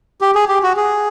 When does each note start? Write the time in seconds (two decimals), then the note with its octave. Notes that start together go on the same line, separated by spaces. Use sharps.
0.21 G4
0.35 G#4
0.49 G4
0.63 F#4
0.77 G#4